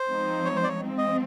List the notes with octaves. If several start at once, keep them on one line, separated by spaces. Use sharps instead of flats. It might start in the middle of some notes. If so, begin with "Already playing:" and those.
Already playing: C5
F3 G#3 C4 D#4
C#5
C5
D5
C#5
F3 G#3 C4
D#5